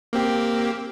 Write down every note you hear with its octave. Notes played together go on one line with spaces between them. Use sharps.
A#3 C4 G4